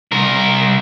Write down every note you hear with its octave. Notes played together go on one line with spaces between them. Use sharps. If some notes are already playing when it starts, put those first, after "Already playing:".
C2 A#4